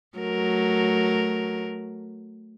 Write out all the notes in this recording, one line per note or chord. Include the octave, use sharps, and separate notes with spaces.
F#3 A3 A#4